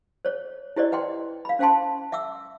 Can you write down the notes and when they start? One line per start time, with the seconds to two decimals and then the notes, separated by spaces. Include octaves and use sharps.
0.25 C5 C#5
0.76 E4 G4 C5 D5 D#5
0.92 B4 F#5 G5 C6
1.45 F5 B5
1.59 C#4 C5 F5 G5 A5 C6
2.12 E5 F#5 D6 E6